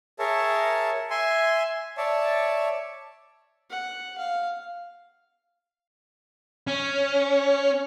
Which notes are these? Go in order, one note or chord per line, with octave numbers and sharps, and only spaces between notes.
G#4 A#4 C#5 E5 A5
E5 G#5 C6
C#5 D5 E5 A5
F#5
F5
C#4